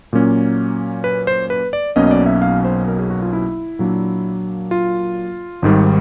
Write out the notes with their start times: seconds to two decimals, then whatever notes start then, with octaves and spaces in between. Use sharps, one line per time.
0.13 A#2 F#3 A#3 C#4
1.04 B4
1.27 C5
1.50 B4
1.73 D5
1.96 B1 B2 F#3 A#3 C#4 D#5
2.07 D#5
2.11 D5
2.26 E5
2.42 F5
2.64 C5
2.88 A#4
2.99 G#4
3.10 F#4
3.22 F4
3.33 E4
3.79 A#2 F#3 A#3 D4
4.71 F4
5.62 G#1 G#2 D#3 G3